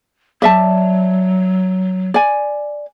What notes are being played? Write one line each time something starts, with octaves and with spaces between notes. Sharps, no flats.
F#3 D5 E5 A5
D5 G#5